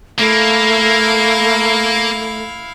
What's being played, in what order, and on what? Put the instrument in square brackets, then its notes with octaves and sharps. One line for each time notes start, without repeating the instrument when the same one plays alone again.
[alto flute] A3 [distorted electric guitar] A#3 [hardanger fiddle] E4 F5